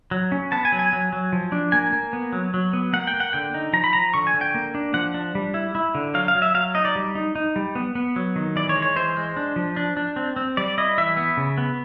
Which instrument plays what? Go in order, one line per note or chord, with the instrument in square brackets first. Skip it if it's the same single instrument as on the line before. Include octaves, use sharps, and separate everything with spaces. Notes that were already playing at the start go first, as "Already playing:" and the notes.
[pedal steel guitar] F#3
C#4
B3 A5
G#5
F#3
G#5
F#3
F#3
F3
D4
A#3 G#5
A#3
B3
F#3
F#3
B3
A#3 F#5
G5
A#3
F#5
D3 G5
D#4
F3 A#5
B5
F3 A#5
D3 C#6
G#5
D3
G5
A#3
D4
F3 F#5
D4
G3
E4
E4
D3
F#3 F5
F5
F#3
E5
F#3 F5
D#4 D#5
D5
G3
D#4
D#4
G3
B3
B3
F#3
D#3
E3 D5
C#5
G#3
C#5
E3 C5
G#3
D4
F3
D4
D4
C4
C4
G3 D5
E4 D#5
E3 E5
B3
C#3
B3